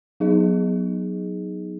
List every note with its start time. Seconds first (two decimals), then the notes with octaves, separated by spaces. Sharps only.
0.20 F#3 B3 D#4 G#4 D#5